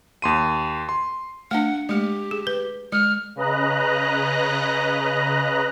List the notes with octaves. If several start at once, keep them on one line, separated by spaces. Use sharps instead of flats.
D#2 C6 D#7
C6
A3 D4 F#5
G#3 A3 G4
G#4
B4
G#3 F6
C#3 B4 D#5 A#5 F#6